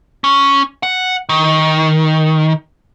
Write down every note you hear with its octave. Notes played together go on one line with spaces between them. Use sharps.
C#4
F#5
D#3